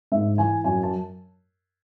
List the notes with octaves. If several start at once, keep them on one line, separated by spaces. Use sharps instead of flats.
G#2 E5
E3 G#5
F#2 G#5
A5